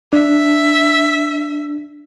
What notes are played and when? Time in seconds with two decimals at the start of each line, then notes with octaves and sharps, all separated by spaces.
0.13 D4 E5